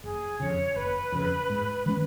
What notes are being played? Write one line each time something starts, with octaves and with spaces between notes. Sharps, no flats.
F#1 G#4
F2 C#3 C#5
F#1 B4
F2 C#3
G#2
D#3 G#3 C#4